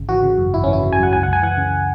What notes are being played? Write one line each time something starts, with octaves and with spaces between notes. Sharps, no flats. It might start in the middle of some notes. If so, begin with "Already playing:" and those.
Already playing: G#1 C#3
E3 F#4
C#3
F#2
G#1 E4
C#4
E3 E4
C#3
G#5
F#2 F#5
C#2 G#5
F#5
C#2
G#5
E3 F#5
C#3